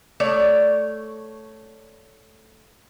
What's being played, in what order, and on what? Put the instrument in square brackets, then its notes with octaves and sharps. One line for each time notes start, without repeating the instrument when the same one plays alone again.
[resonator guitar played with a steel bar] A3 C#5 D5